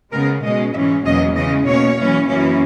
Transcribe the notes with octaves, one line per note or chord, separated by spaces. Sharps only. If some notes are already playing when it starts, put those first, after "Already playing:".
C#3 G#3 B3 A#4
B2 G#3 C#4 D#5
G#2 E3 G#3 C#4 E5
E2 B2 F#3 A#3 C#4 D#5
C#3 E3 G#3 C#4 D#5
B2 A#3 C#4 C#5
F#2 E3 A#3 C#4
F#2 E3 A#3 C#4